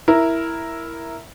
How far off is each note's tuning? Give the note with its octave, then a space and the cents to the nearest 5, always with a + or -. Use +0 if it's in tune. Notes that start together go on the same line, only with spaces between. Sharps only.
E4 +0 A#4 +0